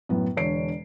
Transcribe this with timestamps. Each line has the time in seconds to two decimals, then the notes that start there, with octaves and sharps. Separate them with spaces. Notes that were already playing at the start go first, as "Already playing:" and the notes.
0.09 F#2 A2 B3
0.36 E1 D3 C#5 C7 D7